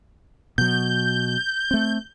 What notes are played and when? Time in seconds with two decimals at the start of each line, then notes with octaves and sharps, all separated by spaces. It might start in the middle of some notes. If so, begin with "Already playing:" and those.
0.58 B2 F#3 G6
1.71 A3 C4